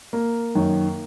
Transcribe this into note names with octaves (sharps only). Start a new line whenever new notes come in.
A#3
F#2 D#3